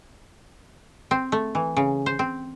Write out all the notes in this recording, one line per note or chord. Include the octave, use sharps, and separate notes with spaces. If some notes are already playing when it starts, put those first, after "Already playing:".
C4
A3
E3
C#3
C5
C4